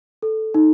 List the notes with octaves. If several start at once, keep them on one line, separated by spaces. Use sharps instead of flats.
A4
D#4